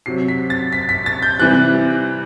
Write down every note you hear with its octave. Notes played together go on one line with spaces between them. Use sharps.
C3 F#3 C7
B6
A6
B6
B6
A6
G6
C3 E3 G3 F#6